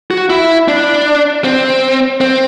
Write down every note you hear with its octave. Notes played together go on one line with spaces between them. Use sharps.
F#4
E4
D4
C4
C4